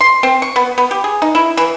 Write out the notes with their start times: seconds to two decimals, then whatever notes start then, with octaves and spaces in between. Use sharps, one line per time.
0.01 C6
0.23 C4
0.42 C#6
0.56 B3
0.78 B3
0.91 G4
1.04 G#4
1.22 D#4
1.35 E4
1.57 E3